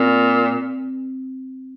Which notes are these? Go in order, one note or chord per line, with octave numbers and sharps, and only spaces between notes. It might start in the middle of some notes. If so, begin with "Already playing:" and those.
Already playing: A#2 C4